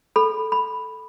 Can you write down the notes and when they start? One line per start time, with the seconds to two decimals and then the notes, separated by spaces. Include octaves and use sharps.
0.16 A4 B5
0.52 B5